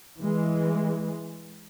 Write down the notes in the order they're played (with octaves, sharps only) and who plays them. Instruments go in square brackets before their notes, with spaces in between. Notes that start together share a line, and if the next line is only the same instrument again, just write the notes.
[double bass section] E3 G#3